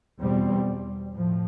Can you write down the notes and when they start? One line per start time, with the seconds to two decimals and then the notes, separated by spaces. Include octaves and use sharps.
0.19 E2 B2 G3 C4
1.14 A2 F3